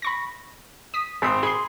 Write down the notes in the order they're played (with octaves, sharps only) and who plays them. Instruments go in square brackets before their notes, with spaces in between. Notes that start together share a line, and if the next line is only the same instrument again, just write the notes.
[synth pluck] B5 C#6 A#6
D#6 B6
[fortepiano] G#1 C4 D#6 [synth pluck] G#4 B5
[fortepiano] G#4 [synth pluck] B5 C6